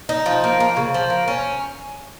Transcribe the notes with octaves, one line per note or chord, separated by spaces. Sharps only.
D#4
F3
A#3
A#3
C#3
F3
A#3
C#4